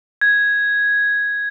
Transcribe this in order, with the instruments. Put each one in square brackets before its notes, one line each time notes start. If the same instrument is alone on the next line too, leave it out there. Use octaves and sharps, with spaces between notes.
[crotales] G#6